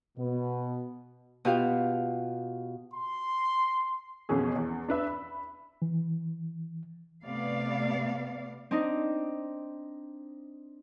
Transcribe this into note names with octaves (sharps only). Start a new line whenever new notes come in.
B2 B3
B2 F4 G4 F5
C6
A1 F2 B2 C#4 G#4
E2
D4 B4 E5
B5
E3
C3 A3 B3 D5 F5
C4 D4 D#4 D#5